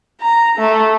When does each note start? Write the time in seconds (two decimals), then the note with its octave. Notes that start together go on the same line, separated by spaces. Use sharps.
0.21 A#5
0.58 A3